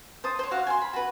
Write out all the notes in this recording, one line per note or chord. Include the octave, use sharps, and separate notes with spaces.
C5 A5 D#6
C5 C#5
F#4 F5 F#5
G#5 C6
B5
F#4 B4